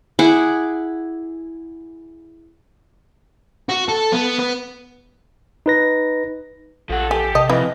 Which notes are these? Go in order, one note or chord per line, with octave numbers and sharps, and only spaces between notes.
E4 G#4 F#5 D6
F#4
A4
B3
B3
D#4 B4 A#6
A#1 F3 A4 F#5
G4 G#5
C3 D#5
F2 E3 B4 D#5